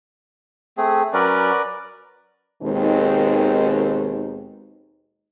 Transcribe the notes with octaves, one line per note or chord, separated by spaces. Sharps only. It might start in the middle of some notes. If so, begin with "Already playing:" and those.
A3 C4 G#4
F#3 C#4 A#4 B4 D5
D#2 B2 D#3 G#3 C4 D#4